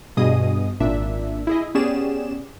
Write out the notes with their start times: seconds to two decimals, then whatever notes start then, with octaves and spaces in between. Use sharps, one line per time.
0.17 G2 B2 G#4 D#5 D#6
0.80 G#1 A#2 D4 E5
1.47 E4 G#4 D#5
1.75 B3 C#4 G4 G#4 D5 E7